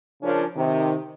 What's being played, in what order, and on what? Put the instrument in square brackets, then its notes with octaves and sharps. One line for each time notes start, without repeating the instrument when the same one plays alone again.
[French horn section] C#3 F3 C#4 D4 A#4
C3 D#3